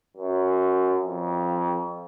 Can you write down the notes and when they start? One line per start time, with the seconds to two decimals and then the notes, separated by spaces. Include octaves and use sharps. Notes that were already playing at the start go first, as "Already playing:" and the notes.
0.17 F#2
1.03 F2